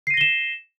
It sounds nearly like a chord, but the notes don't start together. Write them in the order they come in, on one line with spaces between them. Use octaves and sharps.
C7 D#7 A#6 G7 E7